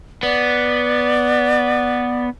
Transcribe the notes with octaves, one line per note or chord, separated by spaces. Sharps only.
B3 D5